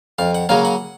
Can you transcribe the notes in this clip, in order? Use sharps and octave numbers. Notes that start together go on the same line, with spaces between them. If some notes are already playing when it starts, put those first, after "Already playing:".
F2 F5
F#5
C#3 F#3 A#3 C#4 F5
F#5